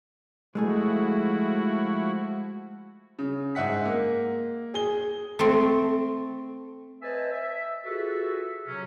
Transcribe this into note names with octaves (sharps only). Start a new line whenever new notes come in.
F3 G#3 A3 E4 F#4 G#4
C#3
G#2 E5 F#5 B6
A#3
G#4 G7
A3 C4
B4 C5 D#5 E5 G#5 A5
E5
F4 F#4 G#4 A4 B4 E5
C3 F#3 C#4